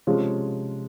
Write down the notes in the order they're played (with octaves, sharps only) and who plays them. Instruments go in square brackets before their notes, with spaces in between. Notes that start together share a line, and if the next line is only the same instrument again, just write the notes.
[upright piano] C3 F3 G#3 C#4 F4